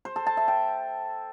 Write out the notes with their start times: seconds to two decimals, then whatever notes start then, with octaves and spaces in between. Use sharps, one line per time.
0.05 C5
0.16 A4
0.27 A5
0.37 E5
0.48 G5